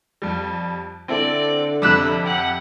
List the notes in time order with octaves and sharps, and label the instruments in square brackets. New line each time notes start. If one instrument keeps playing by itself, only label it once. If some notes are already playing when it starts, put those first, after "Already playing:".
[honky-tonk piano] F2 G3
[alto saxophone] D3 [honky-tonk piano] C4 E4 A4 [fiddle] D5
[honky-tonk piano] F2 C3 [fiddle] B5 [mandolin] D6 E6 F#6
[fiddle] G4 F#5